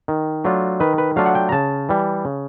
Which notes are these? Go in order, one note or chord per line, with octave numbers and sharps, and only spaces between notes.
D#3
F#3 A3 D4 F4
D#3 B4
B4
F#3 A3 D4 F4 F5
F#5
G5
A#5
C#3 A5
E3 G3
C#3